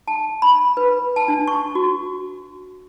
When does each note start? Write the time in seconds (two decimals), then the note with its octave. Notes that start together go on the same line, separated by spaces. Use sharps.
0.08 A5
0.42 B5
0.77 B4
1.16 A5
1.28 D4
1.47 C#6
1.75 F#4